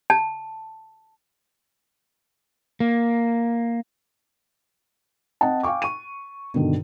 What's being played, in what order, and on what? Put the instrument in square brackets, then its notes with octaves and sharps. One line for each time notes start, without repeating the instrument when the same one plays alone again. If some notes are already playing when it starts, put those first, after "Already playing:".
[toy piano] A5
[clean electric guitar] A#3
[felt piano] C4 D#5 F#5 G5 A5
F5 G5 G#5 C#6 D6
C#6 D#7
G2 B2 D3 D#3